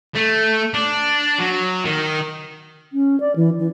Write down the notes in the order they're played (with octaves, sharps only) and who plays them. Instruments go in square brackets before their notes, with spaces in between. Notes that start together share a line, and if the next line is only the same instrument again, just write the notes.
[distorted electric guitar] A3
D4
F#3
D#3
[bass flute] C#4
D5
E3
E3